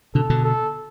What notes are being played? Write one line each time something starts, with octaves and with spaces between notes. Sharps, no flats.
B2 D3 A4
B2 D3
A4